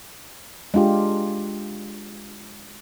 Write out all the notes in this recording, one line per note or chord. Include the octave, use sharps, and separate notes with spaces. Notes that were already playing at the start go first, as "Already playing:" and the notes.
G#3 D4 F4 G4